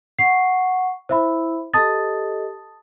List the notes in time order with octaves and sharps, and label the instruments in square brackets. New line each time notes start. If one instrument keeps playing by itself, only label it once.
[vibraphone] F#5 C#6 [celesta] C7
[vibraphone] E4 [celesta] C5 E5 B5
[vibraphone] G4 A4 D#5 [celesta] A5 D#6 A6